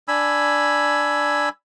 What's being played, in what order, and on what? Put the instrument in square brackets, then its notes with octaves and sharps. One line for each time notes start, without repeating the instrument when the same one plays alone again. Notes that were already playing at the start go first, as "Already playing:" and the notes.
[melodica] D4 G#5 B5 E6